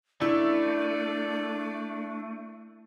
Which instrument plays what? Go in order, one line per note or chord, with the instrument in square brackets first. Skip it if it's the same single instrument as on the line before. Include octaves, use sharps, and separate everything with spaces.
[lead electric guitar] A3 [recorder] D4 [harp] E4 [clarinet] D5